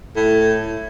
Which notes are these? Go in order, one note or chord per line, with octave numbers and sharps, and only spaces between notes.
A2